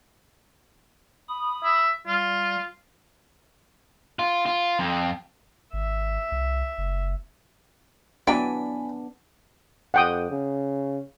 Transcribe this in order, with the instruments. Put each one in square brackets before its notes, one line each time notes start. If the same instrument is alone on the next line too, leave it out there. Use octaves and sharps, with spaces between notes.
[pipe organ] B5 D#6
[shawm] E5
[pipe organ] G3 [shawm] F4
[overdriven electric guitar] F4
F4
F2
[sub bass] G#1 [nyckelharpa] E5
[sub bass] C2
F#1
[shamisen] E3 F#3 G5 [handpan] B3 D4 [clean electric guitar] D5 G#5 [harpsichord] B5
[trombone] F2 [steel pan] F#5 G5 D#6
[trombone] C#3